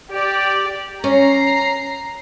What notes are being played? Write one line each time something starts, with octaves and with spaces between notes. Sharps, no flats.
G4 D5
C#4 A#5 C7